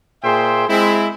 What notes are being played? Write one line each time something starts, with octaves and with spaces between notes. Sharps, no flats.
A#2 G#4 C5 E5 G5 C6
G#3 C4 E4